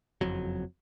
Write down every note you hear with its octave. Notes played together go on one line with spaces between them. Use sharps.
F#1 F2 F#3